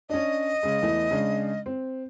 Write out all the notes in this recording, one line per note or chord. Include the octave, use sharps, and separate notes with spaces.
C#4 D4 D#5
C#3 G#3
E2 E3 A3
C#3 G#3 D4
C4